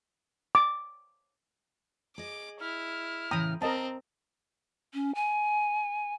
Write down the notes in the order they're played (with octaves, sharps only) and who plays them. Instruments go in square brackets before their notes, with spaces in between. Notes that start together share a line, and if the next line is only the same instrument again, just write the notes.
[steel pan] D6
[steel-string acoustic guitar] G#4 D#5 [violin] D6
[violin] E4 [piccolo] F6
[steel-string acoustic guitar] A2 C#3 E3 [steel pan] G5 A#5 D#6
[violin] C4 [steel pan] A#4 D#5 A5 [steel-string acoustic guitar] A#5 [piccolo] D#6
[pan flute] C#4
G#5